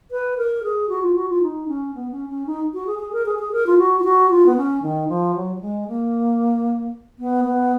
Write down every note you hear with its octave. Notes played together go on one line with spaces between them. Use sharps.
B4
A#4
G#4
F#4
F4
F#4
F4
D#4
C#4
B3
C#4
C#4
D#4
F#4
G#4
G#4
A#4
G#4
G#4
A#4
F4
F#4
F4
F#4
F4
B3
C#4
D#3
F3
F#3
F#3
G#3
A#3
B3
B3